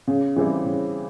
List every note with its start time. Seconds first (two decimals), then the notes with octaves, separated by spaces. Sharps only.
0.08 C#3
0.36 E3 G3 C4 E4
0.66 C#3